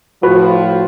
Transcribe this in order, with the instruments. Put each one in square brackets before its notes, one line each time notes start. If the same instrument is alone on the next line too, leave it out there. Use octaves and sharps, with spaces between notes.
[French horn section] A2 F3 [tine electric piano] F#4 [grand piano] B4